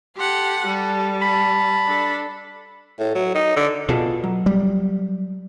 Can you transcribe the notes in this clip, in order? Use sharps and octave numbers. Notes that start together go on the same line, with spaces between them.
G4 A4 F#5 C6
G3 A4
A5 B5
D4 A4
A2
F#3
D#4
D3
B2 F4 G#4 A4
F#3
G3